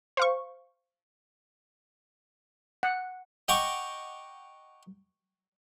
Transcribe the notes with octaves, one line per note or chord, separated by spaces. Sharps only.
C5 F5 C#6
F#5
D#5 F#5 G5 A#5 C#6 D6